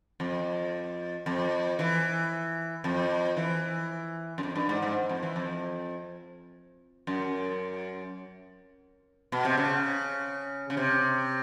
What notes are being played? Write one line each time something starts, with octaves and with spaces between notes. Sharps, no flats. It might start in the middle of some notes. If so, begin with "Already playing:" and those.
F2
F2
E3
F2
E3
F#2
F2
G2
G#2
G#2
F2
E3
F2
F#2
B2
C3
C#3
C#3
C3